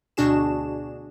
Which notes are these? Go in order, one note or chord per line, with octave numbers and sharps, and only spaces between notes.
D2 B2 D4 F#4 G#4 E7